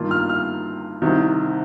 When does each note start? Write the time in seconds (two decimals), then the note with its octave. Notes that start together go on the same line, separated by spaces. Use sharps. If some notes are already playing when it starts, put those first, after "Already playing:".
Already playing: G2 D#3 A#3 F4
0.11 F6
0.29 F6
1.02 C2 C3 D#3